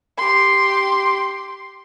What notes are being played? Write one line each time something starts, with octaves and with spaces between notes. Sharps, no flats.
G4 C6